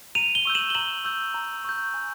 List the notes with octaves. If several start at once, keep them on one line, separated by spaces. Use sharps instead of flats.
A#5 D#7 F7
F7 G7
C#6 E6 G6
E7 F#7
G7
A#5 E7 F#7
C#6 E6 G6
A#5
C#6 E6 G6
G#5